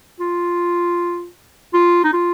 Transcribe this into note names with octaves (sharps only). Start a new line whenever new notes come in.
F4
F4
D#4
F4